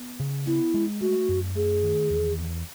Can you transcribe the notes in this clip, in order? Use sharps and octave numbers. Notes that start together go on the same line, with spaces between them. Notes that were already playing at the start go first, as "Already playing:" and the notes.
Already playing: B3
C#3
B3 E4
G#3
A3 F#4
F#2
A3 G#4
D#3
E2
E2